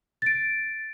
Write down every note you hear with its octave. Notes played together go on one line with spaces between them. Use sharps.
A6 D7